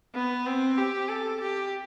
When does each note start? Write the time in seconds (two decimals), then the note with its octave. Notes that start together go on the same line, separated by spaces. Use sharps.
0.15 B3
0.46 C4
0.78 G4
1.08 A4
1.41 G4